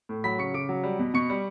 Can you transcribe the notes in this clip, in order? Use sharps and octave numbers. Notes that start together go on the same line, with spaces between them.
A2
F#3 B5 B6
C#3 C#6 C#7
C#3 D6 D7
F#3
G3
B2
B2 C#6 C#7
G3